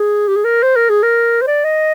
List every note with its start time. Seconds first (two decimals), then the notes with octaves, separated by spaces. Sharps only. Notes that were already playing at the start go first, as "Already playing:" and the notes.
Already playing: G#4
0.28 G4
0.37 G#4
0.44 A#4
0.63 C5
0.76 A#4
0.89 G#4
1.03 A#4
1.42 C5
1.47 D5
1.64 D#5